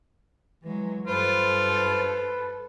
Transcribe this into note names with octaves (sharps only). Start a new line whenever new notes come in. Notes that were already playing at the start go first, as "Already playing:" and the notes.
E3 F#3 G#3
G2 F4 A4 B4 C5